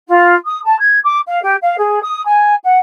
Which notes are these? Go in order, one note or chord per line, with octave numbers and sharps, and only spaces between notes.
F4
D#6
A5
G#6
D6
F5
G4
F5
G#4
D#6
G#5
F#5